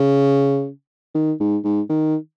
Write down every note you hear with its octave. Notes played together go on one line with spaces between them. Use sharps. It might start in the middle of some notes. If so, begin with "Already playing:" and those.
Already playing: C#3
D#3
G#2
G#2
D#3